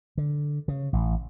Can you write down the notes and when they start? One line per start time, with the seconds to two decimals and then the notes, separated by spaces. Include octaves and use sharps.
0.18 D3
0.68 C#3
0.93 A1